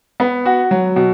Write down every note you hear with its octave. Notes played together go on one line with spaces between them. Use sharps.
B3
F#4
F#3
B2